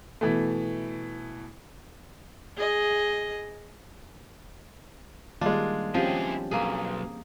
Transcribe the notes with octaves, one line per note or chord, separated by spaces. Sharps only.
B2 E3 A3
G#4 D#5
D#3 G3 G#3 A#3 D4 F4
F3 C4 C#4 E4 G4 G#4
B1 A#3 G#4